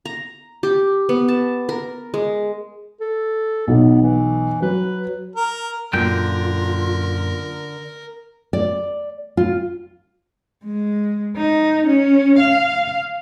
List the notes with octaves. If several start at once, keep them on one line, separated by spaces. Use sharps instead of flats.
A#5
G4
B3
A5
A#4
G#3
A4
B1 B3
E3
F#3 B4
A#4
F#2 A#2 D3 F4 A#4 G5
D5
F4
G#3
D#4
C#4
F5